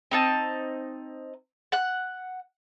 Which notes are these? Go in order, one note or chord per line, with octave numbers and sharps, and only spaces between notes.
C4 D#4 A5
F#5 F#6